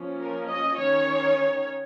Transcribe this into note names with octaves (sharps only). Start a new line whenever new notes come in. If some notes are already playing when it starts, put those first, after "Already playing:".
Already playing: F3 A#3 C#4
A#4
D#5
D#3 C#4 C#5